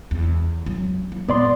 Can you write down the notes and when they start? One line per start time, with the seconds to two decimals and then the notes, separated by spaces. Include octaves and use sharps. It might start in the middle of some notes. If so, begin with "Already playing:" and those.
0.11 E2
0.66 F#3 C#4
1.12 A#3
1.29 A#2 B3 D5 C6